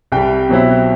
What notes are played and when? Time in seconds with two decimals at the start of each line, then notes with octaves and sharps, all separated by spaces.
0.12 C2 C3 G3 G5
0.49 B2 F#3 C4 E4